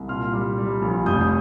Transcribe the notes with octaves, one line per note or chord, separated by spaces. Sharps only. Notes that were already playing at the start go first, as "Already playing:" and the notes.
Already playing: C2
A#2 C6 F6
G3
G3
A#1
F1 D#6 G6